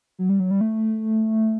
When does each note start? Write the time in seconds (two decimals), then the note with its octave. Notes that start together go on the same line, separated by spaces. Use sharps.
0.19 F#3
0.29 G3
0.40 F#3
0.51 G3
0.61 A3